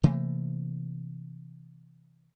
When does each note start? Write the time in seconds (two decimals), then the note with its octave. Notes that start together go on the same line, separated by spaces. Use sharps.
0.03 C3 E3 A3 A#3